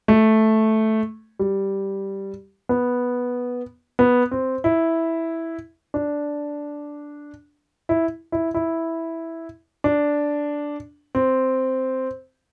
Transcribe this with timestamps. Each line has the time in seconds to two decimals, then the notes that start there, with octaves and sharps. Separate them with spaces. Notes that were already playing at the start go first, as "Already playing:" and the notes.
0.08 A3
1.39 G3
2.69 B3
3.99 B3
4.31 C4
4.64 E4
5.94 D4
7.89 E4
8.32 E4
8.54 E4
9.84 D4
11.15 C4